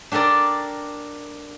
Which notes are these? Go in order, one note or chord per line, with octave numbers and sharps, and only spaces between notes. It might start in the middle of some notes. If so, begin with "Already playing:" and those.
D4 G4 A4 A#4 D5